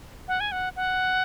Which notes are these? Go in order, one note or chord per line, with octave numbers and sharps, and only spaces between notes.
F#5
G#5
F#5
F#5